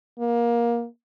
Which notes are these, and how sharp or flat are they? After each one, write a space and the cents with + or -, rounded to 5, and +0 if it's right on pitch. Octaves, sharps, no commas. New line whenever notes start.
A#3 +20